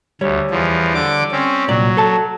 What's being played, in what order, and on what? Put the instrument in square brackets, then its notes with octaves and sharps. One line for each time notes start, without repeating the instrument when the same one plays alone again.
[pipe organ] D2 [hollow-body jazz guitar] G3 C#5
[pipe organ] E2 F3
D3 D6
C4 C#4
[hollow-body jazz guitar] C2 A#2 D5 [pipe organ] F#3
[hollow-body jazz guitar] A4 A5